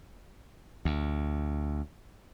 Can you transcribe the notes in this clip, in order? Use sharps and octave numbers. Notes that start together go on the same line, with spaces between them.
D2